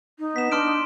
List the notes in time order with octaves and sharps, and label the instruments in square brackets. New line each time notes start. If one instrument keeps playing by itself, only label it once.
[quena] D#4
[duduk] B3 [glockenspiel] B6 E7
[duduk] D4 [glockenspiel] C6 F6 D7